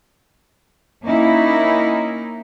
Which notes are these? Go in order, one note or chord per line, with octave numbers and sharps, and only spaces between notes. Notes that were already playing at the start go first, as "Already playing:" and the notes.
A#3 C#4 D#4 E4